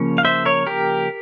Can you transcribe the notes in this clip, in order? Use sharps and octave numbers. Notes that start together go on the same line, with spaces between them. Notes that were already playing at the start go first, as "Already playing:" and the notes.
Already playing: C#3 F3 A#3 C#4 C#5
F5
C5 E5
A#4 C#5
G4 A#4